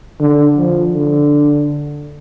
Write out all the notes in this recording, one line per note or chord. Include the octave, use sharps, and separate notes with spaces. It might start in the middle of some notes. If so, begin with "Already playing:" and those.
D3
F3
D3